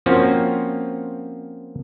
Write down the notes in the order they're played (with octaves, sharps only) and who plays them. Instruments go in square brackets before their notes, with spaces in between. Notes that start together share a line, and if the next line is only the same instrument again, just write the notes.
[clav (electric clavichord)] F3 A#3 C4 C#4 F4 F#4